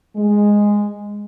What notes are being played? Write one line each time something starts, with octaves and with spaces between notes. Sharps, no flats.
G#3